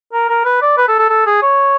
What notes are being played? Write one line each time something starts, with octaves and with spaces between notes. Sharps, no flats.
A#4
A#4
B4
D5
B4
A4
A4
A4
G#4
C#5